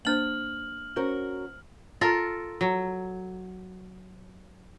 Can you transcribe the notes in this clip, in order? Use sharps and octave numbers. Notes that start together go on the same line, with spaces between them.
A#3 D4 C5 F6 F#7
C#4 F#4 A#4 C5
F4 A4 A#4
F#3